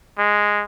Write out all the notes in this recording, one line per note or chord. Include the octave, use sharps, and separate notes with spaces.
G#3